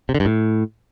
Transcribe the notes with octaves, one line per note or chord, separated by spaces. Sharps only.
C3
D3
G2
A2